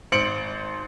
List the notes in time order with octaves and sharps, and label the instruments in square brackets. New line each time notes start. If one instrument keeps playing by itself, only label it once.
[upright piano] G#1 C5 C#7 D7 F#7